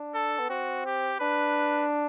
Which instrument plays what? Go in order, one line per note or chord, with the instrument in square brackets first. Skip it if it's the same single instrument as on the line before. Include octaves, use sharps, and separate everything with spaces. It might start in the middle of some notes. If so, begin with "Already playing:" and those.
Already playing: [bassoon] D4
[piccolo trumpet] A4
[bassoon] B3
[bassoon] C4 [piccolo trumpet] F#4
[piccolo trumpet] G4
[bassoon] D4 [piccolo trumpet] B4